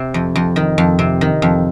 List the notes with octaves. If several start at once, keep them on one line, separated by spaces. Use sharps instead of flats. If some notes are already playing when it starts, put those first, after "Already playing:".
Already playing: C3
F2
F2
D#3
F2
C3
D#3
F2